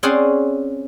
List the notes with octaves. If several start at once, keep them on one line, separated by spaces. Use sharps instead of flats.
C4 C#4 G#4 C5 D5 F#5